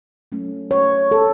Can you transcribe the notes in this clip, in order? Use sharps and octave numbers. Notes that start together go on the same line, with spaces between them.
F#3 A3 C#4
C#5
A4